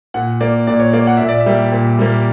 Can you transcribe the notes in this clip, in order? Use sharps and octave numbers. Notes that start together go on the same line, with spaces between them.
A#2 F#5
A#3 D5
A#2 D5
C#5
A#3 D5
F#5
A#2 E5
D5
E5
G3 A#3
A#2
G3 A#3